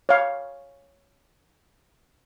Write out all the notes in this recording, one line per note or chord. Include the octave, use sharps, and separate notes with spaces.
C#5 F5